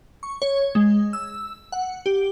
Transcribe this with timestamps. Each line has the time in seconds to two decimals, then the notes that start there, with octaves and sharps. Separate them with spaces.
0.23 C#6
0.42 C#5
0.75 G#3
1.13 E6
1.72 F#5
2.06 G4